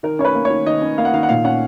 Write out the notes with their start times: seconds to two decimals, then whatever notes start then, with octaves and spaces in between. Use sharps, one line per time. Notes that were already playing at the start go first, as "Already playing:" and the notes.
0.03 D#3 A#4
0.19 C#4 C#5
0.25 B4
0.35 A#3
0.45 C#5
0.50 D#3
0.66 D#3 D#5
0.82 C#4
0.98 A#3 F5
1.05 F#5
1.13 D#3 F5
1.23 F#5
1.29 A#2 F5
1.44 C#4 F#5